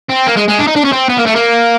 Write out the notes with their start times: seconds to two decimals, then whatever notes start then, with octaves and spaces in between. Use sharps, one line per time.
0.10 C4
0.27 A#3
0.37 G#3
0.48 G#3
0.59 D4
0.67 D#4
0.76 D4
0.84 C#4
0.92 C4
1.09 B3
1.18 A#3
1.26 A3
1.35 A#3